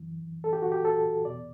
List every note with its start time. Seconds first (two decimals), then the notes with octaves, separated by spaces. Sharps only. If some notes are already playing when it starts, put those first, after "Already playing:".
Already playing: F#2 E3
0.44 A4
0.53 G4
0.62 F#4
0.72 G4
0.85 A4
1.25 E2 B2 D5